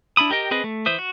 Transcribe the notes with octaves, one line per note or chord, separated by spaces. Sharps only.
D4 E4 B5 D#6
G4 A#4 D#5 G5
C4 G#4 B4 D#5
A3
E3 C5 E5 D#6
F#4